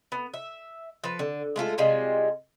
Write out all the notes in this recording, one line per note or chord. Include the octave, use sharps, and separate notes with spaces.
B3
E5
F3 B4
D3
G#3 A3 F4 A4
C3 G3 G#3 F4